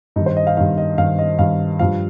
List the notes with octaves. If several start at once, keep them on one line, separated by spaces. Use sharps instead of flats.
G2 D#3 D#4
C5
D#5
F5
G2 D#3 F5
D#5
G2 D#3 F5
D#5
G2 D#3 F5
G2 F3 F5